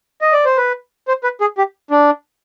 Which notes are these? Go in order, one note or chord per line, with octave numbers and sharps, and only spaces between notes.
D#5
D5
C5
B4
C5
B4
G#4
G4
D4